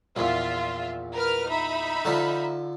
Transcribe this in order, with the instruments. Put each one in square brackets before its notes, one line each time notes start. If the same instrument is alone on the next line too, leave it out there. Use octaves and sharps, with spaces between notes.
[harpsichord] A#1 E2 [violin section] F4 E5
[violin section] A#4 B4 F6
D#4 E5 B5
[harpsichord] D3 F3